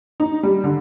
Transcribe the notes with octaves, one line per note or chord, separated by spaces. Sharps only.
D#4
G3
D3